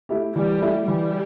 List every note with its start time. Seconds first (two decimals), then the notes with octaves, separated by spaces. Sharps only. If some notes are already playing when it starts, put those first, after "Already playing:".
0.09 A3 E4 G4
0.35 E3 G3
0.61 A3 E4 G4
0.87 E3 G3